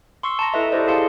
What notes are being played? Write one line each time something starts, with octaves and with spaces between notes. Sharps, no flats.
C6 C#6 E6 C7 C#7
A5 A#5 A#6
E4 A4 B4 D#5 E5
E4 G4 A4 C5 D5 D#5
E4 G#4 F5 A5 C6 C#7